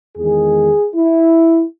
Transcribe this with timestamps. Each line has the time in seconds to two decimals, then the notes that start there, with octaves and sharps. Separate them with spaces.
0.17 E2 D#3 G#3 G#4
0.95 E4